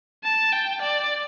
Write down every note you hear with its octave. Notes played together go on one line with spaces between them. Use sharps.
A5
G5
D5